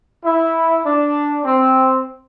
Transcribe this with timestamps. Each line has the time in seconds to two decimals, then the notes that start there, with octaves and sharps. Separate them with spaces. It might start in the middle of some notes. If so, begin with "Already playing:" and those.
0.25 E4
0.85 D4
1.45 C4